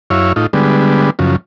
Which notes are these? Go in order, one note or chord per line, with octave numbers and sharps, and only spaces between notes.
F#2 E4 C#5 F5
A2 D#4 F4
D3 G3 G#3 B3
F#2 C#3 F3